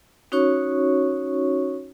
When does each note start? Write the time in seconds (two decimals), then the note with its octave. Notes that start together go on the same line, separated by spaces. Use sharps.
0.32 C#4 D#4 F#4 C#5 C#6